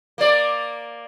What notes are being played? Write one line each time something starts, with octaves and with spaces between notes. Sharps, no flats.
A#3 D5